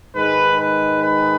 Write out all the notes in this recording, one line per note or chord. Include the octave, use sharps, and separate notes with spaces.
G#2 D#3 G#3 B4
B4
B4